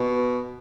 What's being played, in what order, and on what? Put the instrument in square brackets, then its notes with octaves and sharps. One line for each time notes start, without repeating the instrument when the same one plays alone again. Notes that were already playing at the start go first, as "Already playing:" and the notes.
Already playing: [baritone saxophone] B2